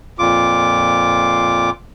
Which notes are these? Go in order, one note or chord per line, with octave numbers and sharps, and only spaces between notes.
F2 A#2 F4 D6